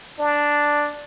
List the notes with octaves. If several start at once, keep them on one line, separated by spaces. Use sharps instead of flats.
D4